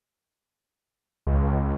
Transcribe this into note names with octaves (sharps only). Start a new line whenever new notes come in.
C#2